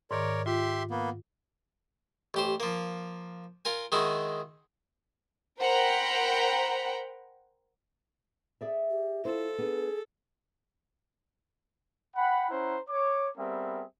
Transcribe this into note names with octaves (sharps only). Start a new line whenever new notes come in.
G#2 D#3 A#4 C#5 D5
F4 G4 E5 C6
A#3 B3
A1 G4 C5
F3 A#3
F4 A#4 G#5
D#3 G#3 D#4 E4 F#4
A#4 C5 F#5 G5 A#5 B5
G#4 D5 E5
G4
E4 F4 A4 C5
B3 D4 G#4
F#5 G5 B5
C#4 E4 C5 F#5 A#5
C#5 D6
G3 B3 C4 G#4 A#4 E5